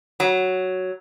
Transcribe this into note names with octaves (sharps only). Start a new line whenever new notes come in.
F#3